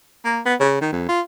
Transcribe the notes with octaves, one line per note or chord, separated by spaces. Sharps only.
A#3
B3
C#3
D#3
F2
F4